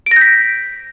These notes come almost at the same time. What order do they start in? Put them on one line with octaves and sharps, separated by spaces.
D7 A#6 G6 B6